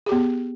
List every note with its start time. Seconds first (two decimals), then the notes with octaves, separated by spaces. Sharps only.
0.06 G#4
0.09 G4
0.12 B3